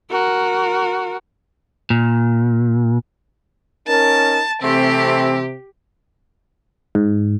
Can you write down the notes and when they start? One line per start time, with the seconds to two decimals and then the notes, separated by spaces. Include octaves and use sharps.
0.11 F#4 A#4
1.90 A#2
3.87 C#4 D#4 A#4 A5
4.63 C3 E3 A3 C4 G4
6.95 G#2